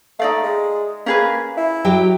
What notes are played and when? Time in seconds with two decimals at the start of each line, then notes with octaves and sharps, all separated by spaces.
0.19 A3 D#4 D5 F5
0.43 G#3
1.06 A#3 C#4 G#4 B4
1.57 E4
1.84 F#3 G4 G5